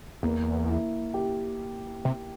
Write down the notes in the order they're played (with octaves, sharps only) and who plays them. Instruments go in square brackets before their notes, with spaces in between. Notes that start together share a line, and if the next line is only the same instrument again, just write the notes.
[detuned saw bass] E2 [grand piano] A#3
[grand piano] E4
G4
[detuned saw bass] C3